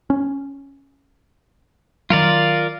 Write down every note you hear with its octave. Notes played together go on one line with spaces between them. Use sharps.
C#4
D#3 F#3 F4 A#4 D5